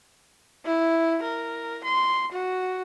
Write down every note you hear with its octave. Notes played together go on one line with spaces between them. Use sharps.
E4
A#4
C6
F#4